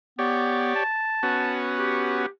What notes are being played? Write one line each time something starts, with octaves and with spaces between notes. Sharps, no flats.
B3 G4 C#5 D5
A5
B3 C#4 F#4
G4